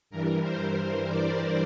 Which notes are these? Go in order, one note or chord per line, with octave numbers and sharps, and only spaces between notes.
G2 E3 G3 A#4
C5
C5
D5